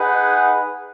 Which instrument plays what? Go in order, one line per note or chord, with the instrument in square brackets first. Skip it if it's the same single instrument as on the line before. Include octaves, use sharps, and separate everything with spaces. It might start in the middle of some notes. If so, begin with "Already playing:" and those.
Already playing: [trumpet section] D#4 G#4 B4 F#5